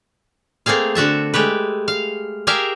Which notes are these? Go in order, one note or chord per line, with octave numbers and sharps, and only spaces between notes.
A3 A#3 C4 G#4 F5
D3 F#4 E5 A5
G#3 A3 G4 B4
F5
G4 G#4 A#4 E5 F5